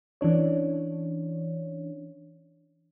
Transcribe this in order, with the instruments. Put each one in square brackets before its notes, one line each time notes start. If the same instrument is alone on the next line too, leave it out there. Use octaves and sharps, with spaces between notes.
[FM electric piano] E3 C#4 D4 C#5